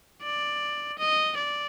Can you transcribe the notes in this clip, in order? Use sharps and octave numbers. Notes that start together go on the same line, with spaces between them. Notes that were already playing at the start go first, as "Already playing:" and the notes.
D5
D#5
D5